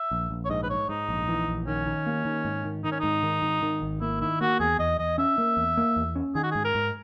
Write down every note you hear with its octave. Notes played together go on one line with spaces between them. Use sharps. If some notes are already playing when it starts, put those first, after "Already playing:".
Already playing: E5
A#1
A#1
C#5
G#2 D#5
B4
G#2 C#5
G#2 D#4
A#1
E3
A#1
D#3 C#4
D#3
A#3
D#3
G#2
D#3
D#3 D#4
C#4
G#2 D#4
D#3
G#2
D#3
G#1
A#3 E4
D#3 E4
A#3 F#4
E2 G#4
E2 D#5
E2 D#5
C#4 E5
A#3
E2
A#3
E2
C#4
D#3 G#4
F#4
G#2 G#4
A#4
G#2